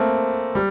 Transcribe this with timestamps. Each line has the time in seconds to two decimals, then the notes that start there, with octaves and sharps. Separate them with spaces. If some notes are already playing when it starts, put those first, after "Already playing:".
Already playing: A3 A#3 C4
0.55 G3